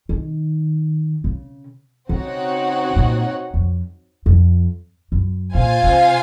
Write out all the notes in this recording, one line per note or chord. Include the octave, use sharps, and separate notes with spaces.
D#3
C#3
C#3 C4 D#4 F#4 C#5 F#5
A#2
F2
F2
F#2
A#2 F4 C5 F5 G#5
C3